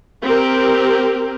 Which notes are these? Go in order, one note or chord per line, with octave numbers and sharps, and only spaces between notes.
C4 G4 A#4